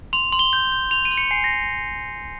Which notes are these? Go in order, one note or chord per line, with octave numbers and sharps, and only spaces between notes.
C6 F7
C6
G7
G6
G6
C6 F7
D#7
C6
C#7
G#5 C7
A#6